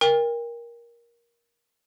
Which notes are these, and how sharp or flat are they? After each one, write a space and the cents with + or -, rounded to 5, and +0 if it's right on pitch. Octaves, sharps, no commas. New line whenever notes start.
A#4 +15 G5 +40